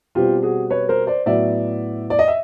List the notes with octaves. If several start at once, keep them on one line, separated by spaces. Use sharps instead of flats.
B2 G3 C4 F4 G4
F#4 G#4
B4 C#5
A#4 C5
C5 D5
A2 F#3 B3 D5 E5
D5
D#5
E5